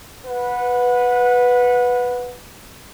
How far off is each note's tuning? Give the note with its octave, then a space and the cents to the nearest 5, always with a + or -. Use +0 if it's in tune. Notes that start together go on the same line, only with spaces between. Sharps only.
B4 +0 F#5 -25